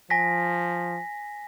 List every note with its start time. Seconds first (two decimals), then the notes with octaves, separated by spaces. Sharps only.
0.10 F3 G#5 A#6 B6